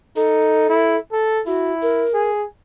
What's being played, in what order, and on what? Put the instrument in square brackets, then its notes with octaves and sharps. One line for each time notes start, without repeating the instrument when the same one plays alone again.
[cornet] D#4 [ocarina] A4
[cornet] E4
A4
[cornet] E4 [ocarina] F#4
[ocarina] A#4
[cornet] G#4